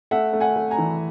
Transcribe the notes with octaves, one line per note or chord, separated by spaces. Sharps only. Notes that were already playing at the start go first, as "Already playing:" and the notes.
A3 E5 F#5
A3
F#5 G#5
A3
G#5 A#5
E3